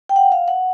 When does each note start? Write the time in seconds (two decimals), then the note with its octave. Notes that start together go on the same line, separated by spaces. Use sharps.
0.09 G5
0.16 F#5
0.32 F5
0.48 F#5